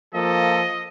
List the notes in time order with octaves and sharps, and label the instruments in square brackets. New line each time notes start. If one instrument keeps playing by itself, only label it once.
[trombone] F3 [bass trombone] A#3 [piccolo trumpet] A4 [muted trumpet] D#5